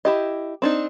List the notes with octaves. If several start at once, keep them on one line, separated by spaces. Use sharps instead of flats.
E4 G4 D#5
C4 D4 D#4